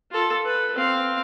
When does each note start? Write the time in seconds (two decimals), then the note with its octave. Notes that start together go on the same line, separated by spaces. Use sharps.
0.12 F4 A4
0.45 B4
0.74 C4 F5